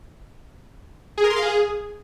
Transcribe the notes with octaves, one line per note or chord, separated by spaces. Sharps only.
G#4
A#4
C6
F5
G#4